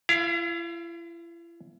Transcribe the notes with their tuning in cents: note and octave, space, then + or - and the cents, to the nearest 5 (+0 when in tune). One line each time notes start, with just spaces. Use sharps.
E4 +40 F5 +0